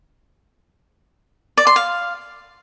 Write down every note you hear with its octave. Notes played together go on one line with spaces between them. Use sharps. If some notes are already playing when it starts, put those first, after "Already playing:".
D5
C6
F5